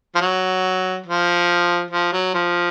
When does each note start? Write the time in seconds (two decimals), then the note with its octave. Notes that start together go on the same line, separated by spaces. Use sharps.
0.15 F3
0.21 F#3
1.06 F3
1.91 F3
2.12 F#3
2.34 F3